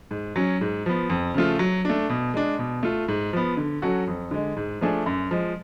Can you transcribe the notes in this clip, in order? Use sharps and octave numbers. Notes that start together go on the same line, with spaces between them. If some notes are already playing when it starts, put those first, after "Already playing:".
G#2
F#3 C#4
G#2
F3 B3
F2
C#3 F3 A3 F4
F#3
A3 D4
B2
G#3 D4
B2
A3 F4
G#2
F3 B3
D3
F#3 C#4 F#4 A4
F2
D3 G#3
G#2
F3 A3 D4 G#4
F#2
F3 G#3